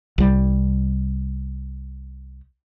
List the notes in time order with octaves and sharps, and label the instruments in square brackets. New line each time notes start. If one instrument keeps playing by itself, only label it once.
[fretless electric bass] C2 G3